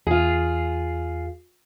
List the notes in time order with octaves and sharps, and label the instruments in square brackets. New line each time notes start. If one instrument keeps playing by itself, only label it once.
[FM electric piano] E2 C7 [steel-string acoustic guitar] F4 G#4